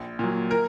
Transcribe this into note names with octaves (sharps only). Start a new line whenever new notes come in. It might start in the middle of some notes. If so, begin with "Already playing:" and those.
Already playing: A#1
A#2 F#3
A#4